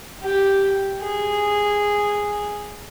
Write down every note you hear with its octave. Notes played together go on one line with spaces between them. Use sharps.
G4
G#4